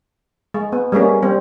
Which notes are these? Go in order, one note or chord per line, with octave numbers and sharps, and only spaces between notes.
G#3
B3
G3 G#3 A#3 C#4
G3 C4